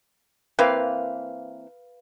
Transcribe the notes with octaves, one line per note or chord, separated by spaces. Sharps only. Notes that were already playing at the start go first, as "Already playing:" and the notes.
E3 A#3 C4 B4 F5